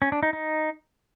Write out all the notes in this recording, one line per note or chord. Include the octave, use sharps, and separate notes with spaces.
C#4
D4
D#4
D#4